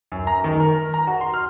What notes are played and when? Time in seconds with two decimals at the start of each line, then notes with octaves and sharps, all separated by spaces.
0.12 F#2
0.27 A#5
0.44 D#3
0.60 A#4
0.94 A#5
1.07 F#4
1.21 C6
1.33 F6